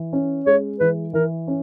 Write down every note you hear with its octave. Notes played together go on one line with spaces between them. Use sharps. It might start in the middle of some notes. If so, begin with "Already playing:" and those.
Already playing: E3
C#4
G#3 C#5
E3 B4
E3 A#4
C#4